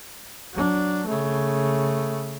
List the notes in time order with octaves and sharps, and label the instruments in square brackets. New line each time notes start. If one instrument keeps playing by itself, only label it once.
[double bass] F#3 D4
C#3 A3